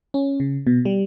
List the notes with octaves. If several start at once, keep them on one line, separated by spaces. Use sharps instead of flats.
C#4
C#3
B2
G3